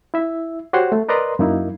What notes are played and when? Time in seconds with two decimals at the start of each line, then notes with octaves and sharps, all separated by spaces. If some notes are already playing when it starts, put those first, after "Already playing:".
0.14 E4 E5
0.73 F#4 G4 C5 C#5 F#5 C6
0.92 A3
1.09 A#4 B4 D5 D#5 A#5 C6
1.39 F#2 A#3 D#4 E4